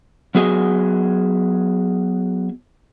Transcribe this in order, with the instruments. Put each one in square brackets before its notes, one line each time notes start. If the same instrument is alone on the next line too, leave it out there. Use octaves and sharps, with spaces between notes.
[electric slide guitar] F#3 B3 F#4 G#4 D#5 G#5